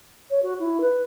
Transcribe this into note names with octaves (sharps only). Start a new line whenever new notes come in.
C#5
F#4
E4
B4